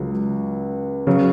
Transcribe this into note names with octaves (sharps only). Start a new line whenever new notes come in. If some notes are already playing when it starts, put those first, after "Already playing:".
Already playing: C#2 C#3 F#3
C#3 F#3